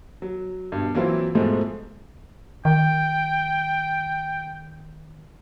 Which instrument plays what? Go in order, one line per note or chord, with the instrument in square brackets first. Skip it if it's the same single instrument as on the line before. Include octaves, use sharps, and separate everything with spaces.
[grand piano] F#3
G2 B2
E3 F#3 A#3 C4 E4 F4
G#2 B2 F3 G#3 A3
[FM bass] D#3 [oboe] G5